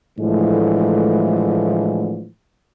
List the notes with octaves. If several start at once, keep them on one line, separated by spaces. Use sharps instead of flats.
A2 D3 E3 F3 G#3 A3